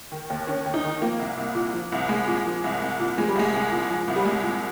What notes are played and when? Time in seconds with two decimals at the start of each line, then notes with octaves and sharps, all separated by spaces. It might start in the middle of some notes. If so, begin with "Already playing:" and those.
0.12 D#3
0.30 D#2
0.47 D#3 C#4
0.66 D#2
0.74 D#4
0.84 D#3
1.01 F3 A#3
1.19 C2
1.37 C2
1.55 A#2
1.74 F3
1.92 C2
2.09 C2 G#3
2.27 A#2
2.46 F3
2.64 C2
2.82 C2
2.99 A#2
3.17 F3 G#3
3.28 G3
3.35 C2 G#3
3.54 C2
3.72 A#2
3.89 F3
4.08 C2
4.16 G3
4.25 C2 G#3
4.43 A#2